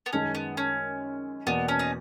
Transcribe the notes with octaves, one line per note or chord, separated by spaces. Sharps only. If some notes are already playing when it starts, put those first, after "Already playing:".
B3
F#2 D#3 G#3 C#4 D#4
B3
C#4
E2 B2 A#3 B3
C#4
D#4